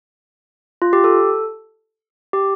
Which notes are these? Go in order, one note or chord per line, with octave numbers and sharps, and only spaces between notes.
F4
G4
A4
G4